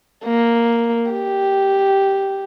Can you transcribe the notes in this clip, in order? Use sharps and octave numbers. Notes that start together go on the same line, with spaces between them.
A#3
G4